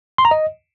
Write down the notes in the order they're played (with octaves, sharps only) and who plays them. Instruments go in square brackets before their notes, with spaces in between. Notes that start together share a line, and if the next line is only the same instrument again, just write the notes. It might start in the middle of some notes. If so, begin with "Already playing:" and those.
[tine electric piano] C6
A#5
D#5